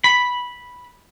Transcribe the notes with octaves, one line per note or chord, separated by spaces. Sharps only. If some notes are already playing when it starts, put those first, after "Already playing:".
B5